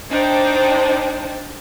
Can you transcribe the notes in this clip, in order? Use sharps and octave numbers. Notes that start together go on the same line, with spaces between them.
D4 D#4 C5 G5 A5